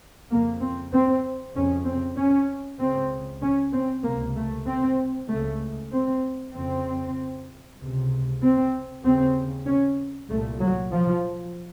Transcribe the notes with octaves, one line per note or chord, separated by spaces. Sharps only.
F2 C#3 A#3
C4
C4
F2 C#3 C#4
C4
C#4
C#2 C#3 C4
C#4
C4
C#2 C3 A#3
A3
C4
C#2 C#3 A3
C4
F2 C#3 C4
C#2 C3
C4
D#2 C#3 C4
C#4
C2 A#2 A3
F#3
F3